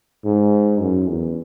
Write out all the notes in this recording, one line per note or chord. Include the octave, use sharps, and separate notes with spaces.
G#2
F#2
E2